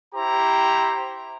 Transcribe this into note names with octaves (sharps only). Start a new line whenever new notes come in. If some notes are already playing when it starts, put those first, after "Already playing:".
E4 G4 C5 A#5